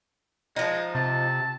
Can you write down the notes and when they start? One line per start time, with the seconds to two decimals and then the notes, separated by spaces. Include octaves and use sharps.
0.56 F3 G#3 D#4
0.95 C3 A5